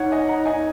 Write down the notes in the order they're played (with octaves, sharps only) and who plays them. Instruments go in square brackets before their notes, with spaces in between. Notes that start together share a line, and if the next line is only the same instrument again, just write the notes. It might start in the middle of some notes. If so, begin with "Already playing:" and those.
Already playing: [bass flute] D#4 [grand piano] C#5 F#5
[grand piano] D#5 G#5
F#5 A#5
D#5 G#5